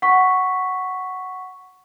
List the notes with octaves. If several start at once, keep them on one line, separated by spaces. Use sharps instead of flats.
F#5 C#6 B6